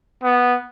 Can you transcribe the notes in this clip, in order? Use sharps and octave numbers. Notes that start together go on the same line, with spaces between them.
B3